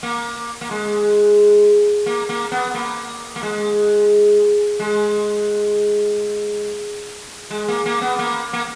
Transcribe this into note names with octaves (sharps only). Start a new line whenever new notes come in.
A#3
A#3
G#3
A#3
A#3
B3
A#3
A#3
G#3
G#3
G#3
A#3
A#3
B3
A#3
A#3